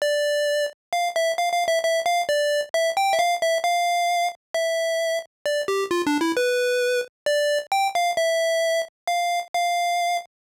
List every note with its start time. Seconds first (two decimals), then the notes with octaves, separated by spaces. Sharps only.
0.02 D5
0.93 F5
1.16 E5
1.38 F5
1.53 F5
1.68 E5
1.84 E5
2.06 F5
2.29 D5
2.74 E5
2.97 G5
3.12 E5
3.19 F5
3.42 E5
3.64 F5
4.54 E5
5.46 D5
5.68 G4
5.91 F4
6.07 D4
6.21 E4
6.37 B4
7.26 D5
7.72 G5
7.95 F5
8.17 E5
9.07 F5
9.54 F5